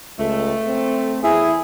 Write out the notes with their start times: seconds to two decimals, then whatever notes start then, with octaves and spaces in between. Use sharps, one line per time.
0.18 C#2 A3
0.67 C4
1.24 E2 E4 G#4